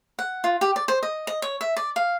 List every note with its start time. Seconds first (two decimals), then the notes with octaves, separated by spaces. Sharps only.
0.19 F#5
0.44 F4
0.61 G4
0.76 D5
0.88 C5
1.03 D#5
1.27 D#5
1.42 C#5
1.61 E5
1.77 D5
1.96 F5